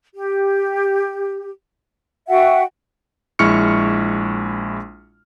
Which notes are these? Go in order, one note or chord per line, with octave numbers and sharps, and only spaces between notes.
G4
F#4 E5 F#5 G5
A#1 G#3 E4 C#6 F6 C#7